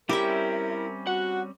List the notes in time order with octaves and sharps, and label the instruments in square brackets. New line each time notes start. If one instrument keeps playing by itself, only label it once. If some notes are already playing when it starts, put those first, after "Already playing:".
[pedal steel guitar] G3 C4 C#4 [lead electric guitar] E4 [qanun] G4 E5 [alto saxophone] A#4
[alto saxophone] F#4 [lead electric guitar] F#5